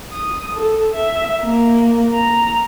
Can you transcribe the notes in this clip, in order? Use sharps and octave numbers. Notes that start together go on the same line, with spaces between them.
D#6
A4
E5
A#3
A#5